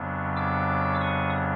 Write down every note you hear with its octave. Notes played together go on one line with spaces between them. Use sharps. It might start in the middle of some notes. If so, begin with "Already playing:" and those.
Already playing: F2 C#3 F#3 B3 D4
D6 E6
C#6 D#6